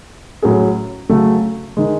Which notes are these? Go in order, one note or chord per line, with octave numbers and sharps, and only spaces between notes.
A2 F#3 C#4 G#4
C#3 F#3 A3
D#3 G#3